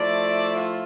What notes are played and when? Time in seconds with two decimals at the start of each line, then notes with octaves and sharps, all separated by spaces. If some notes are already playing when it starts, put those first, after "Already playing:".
Already playing: F3 A3 E4 D5
0.54 F4